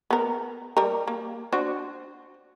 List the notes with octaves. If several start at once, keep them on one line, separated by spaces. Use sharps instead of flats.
B3 A#4
G3 A#4
A#3
D4 F#4 C5